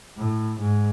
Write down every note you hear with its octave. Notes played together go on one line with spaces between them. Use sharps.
A2
G#2